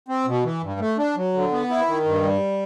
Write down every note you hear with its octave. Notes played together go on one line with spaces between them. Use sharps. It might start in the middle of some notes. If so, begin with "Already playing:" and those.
C4
B2
E3
G2
A3
D4
F#3
D3
B3
E4
D#3
G2
G3